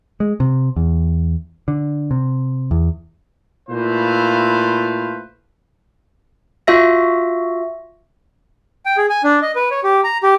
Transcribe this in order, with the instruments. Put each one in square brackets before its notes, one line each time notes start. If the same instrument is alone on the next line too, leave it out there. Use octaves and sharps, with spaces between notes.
[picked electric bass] G#3
C3
E2
D3
C3
E2
[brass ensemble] A#2 A3 E4 B4 C5 F5
[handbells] F4 F#4 E5 A#6
[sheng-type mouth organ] G5
G#4
G#5
D4
D#5
B4
C#5
G4
A#5
G4